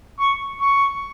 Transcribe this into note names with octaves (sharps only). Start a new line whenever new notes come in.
C#6
C#6